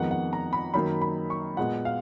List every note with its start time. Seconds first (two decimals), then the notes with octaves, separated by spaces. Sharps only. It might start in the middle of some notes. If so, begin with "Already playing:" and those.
Already playing: F2 D#3 G#3 B3 F#5
0.11 F#5
0.33 A#5
0.53 B5
0.74 F#2 D#3 A#3 B5
1.01 B5
1.30 C#6
1.57 A#2 G#3 B3 F#5
1.85 F5